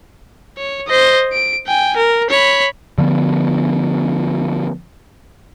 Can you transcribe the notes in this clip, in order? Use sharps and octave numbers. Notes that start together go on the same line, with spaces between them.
C#5
C5 D#5
D7
G5 G#5
A#4
C#5 B5
D3 F3 B3